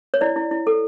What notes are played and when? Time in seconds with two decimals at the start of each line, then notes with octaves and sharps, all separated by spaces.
0.14 C#5
0.21 E4 D5
0.36 E4
0.51 E4
0.67 A4